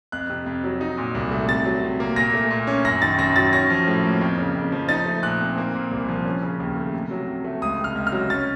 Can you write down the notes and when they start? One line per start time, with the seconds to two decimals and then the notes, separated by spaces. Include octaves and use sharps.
0.12 F2 F#6
0.30 C3
0.46 F2
0.64 F#3
0.81 D#4
0.98 A#2
1.15 C2
1.31 A3
1.48 C3 A6
1.65 F#3
1.83 C3
2.00 A#3
2.16 A#2 A#6
2.34 A3
2.51 A#2
2.67 C#4
2.85 F#2 A#6
3.02 D#3 A6
3.18 F#2 A#6
3.36 F#3 A6
3.53 C#4 A#6
3.70 F3
3.87 A2
4.04 A#3
4.21 F2
4.38 C#3
4.55 F2
4.72 F3
4.89 D#4 A6
5.06 A3
5.23 A#2 F#6
5.41 C4
5.58 A#3
5.75 A#2
5.91 C2
6.08 F3
6.25 C#4
6.43 C#3
6.60 D#2
6.76 A3
6.94 C3
7.11 F#3
7.27 C3
7.44 A3
7.62 C#2 D#6
7.79 C3
7.84 F6
7.95 C#2
8.07 F6
8.12 F#3
8.30 C#4 A6